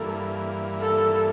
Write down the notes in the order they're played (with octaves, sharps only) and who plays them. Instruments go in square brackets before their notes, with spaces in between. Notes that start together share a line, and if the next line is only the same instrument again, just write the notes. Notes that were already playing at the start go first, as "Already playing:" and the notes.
Already playing: [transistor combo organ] G2 E3 A#3 [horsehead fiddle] A4
[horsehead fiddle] A4